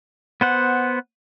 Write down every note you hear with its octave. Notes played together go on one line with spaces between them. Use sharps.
B3 C5 F#5